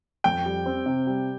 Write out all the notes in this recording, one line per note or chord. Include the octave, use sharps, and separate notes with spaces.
F2 G5
G3
C4
C3
G3